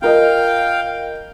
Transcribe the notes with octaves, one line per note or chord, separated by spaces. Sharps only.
F4 A#4 D#5 F5 G5